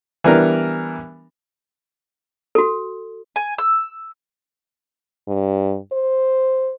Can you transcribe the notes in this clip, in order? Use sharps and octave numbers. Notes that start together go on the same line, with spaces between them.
E3 G3 B3 D4 A#4
F#4 A4
G#5
E6
G2
C5